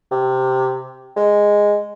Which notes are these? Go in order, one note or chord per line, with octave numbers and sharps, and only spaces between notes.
C3
G#3